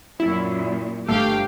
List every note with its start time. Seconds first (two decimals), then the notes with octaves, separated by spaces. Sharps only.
0.20 F#2 A#2 E4
1.08 G1 A3 G4 F5 G5